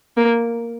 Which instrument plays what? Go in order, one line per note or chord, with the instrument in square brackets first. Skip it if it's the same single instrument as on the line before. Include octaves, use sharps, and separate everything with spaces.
[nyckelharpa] A#3